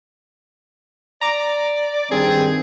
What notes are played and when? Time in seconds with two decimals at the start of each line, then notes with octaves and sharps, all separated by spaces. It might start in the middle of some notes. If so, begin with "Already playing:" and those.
1.21 D5 A#5 D6
2.11 G2 D#3 C4 G#4